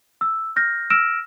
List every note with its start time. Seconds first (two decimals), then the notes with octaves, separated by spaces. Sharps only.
0.21 E6
0.56 F6 G6 A#6
0.90 E6 F6 A#6 D7 E7